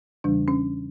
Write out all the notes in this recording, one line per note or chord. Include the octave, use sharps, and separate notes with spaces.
E2 C#3 E3 G3 D4
C#4